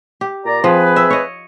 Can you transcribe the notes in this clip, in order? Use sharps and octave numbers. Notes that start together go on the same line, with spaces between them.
G4
A#2 D5 A#5
F3 C4 G#4 B4
E5
C#5 D#5